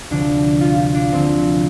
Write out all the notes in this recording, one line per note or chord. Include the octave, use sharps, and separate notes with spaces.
D2 C3 F3 D4
F4
F4
D4
D2 C3 F3 C4